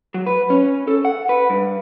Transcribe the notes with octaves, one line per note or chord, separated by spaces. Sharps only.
F#3
B4
C#4
A4
F#5
B4
G2